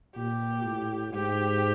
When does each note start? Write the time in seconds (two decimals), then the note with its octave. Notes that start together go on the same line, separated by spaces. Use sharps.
0.16 A#2 G4
0.65 A2
1.13 G#2 G4